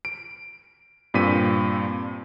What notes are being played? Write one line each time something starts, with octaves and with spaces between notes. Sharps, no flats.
D7
G2 A#2 C4 B6 D#7